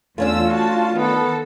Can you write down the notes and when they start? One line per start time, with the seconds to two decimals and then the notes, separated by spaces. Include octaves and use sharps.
0.18 E2 A3 C#4 D4 F4 E6
0.51 F#4 A5
0.96 D#3 B3 A4